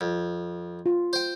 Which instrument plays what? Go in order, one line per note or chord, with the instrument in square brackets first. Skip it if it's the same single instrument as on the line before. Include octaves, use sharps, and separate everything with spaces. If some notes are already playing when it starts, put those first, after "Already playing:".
[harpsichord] F2
[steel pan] F4
[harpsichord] C5 G5